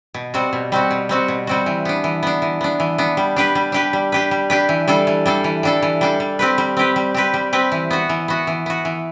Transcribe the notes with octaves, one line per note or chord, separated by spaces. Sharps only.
B2
G3 C4 F#4
B2
G3 C4 F#4
B2
G3 C4 F#4
B2
G3 C4 F#4
E3
B3 D4
E3
B3 D4
E3
B3 D4
E3
B3 D4
G3
D4 G4 B4
G3
D4 G4 B4
G3
D4 G4 B4
G3
D4 G4 B4
E3
G3 D4 A4
E3
G3 D4 A4
E3
G3 D4 A4
E3
G3 D4 A4
G3
C4 G4 B4
G3
C4 G4 B4
G3
C4 G4 B4
G3
C4 G4 B4
E3
B3 F#4
E3
B3 F#4
E3
B3 F#4
E3